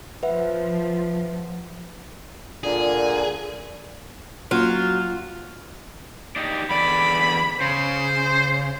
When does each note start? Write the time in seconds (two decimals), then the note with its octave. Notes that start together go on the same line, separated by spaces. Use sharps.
0.23 F3 B4 E5 F#5
2.63 A#2 D3 G#4
4.51 F#3 A#3 C#4 F4
6.36 D4 D#4 G4
6.70 E2 D3 D5 B5
7.60 C#3 C5